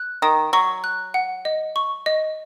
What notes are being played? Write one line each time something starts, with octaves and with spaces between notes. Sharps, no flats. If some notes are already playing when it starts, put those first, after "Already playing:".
Already playing: F#6
D#3 D#6
F#3 C#6
F#6
F#5
D#5
C#6
D#5